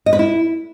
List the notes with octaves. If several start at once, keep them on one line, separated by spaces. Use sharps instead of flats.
D#5
B4
E4